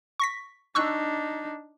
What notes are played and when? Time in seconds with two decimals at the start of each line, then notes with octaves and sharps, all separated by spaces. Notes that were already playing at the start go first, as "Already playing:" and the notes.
0.20 C#6 A#6 B6
0.75 D4 D#4 C#6 E6 F#6